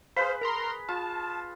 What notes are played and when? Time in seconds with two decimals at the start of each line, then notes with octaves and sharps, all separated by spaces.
0.16 G#4 B4 C5 F5 B5
0.41 A#4 A#5 C6
0.89 F4 A5